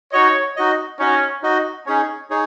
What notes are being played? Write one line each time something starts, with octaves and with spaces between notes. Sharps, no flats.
D#4 F#4 C#5 D#5
D#4 F#4 D#5
C#4 D#4 F#4 D#5
D#4 F#4 D#5
C#4 D#4 G#4 C#5
D#4 G#4 C#5